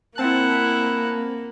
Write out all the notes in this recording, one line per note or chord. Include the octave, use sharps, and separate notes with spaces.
A#3 C4 E4 F#5 A5